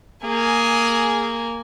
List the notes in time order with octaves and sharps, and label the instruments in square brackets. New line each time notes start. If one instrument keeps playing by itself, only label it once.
[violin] A#3 G#5 [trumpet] G#4